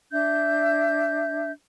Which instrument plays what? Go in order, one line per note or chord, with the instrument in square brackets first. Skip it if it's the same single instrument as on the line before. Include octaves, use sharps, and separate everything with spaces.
[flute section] D4 E5 G6